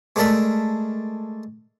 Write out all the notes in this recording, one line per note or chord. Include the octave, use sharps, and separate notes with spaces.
G#3 A3 D4 A#4 D5 E5